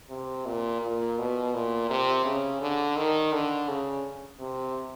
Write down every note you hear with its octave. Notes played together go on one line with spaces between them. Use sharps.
C3
A#2
A#2
B2
A#2
C3
C#3
D3
D#3
D3
C#3
C3